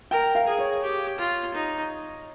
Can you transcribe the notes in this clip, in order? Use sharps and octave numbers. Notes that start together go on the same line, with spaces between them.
A#4 G5
F5
G#4
C#5
G4
F4
D#4